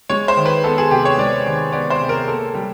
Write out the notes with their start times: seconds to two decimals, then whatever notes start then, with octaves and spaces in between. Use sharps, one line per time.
0.09 G#3 C#5
0.28 C5
0.37 D#3
0.46 B4
0.64 B3 A4
0.78 G#4
0.91 C3 G4
1.05 C#5
1.18 G#3 D5
1.46 D#3
1.72 B3 D5
1.90 C5
2.00 C3
2.09 A#4
2.27 A#3 A4
2.55 G3